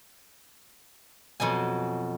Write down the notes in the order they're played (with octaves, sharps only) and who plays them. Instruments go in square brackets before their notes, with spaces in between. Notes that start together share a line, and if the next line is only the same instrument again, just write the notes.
[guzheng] F2 B2 F#3 G#5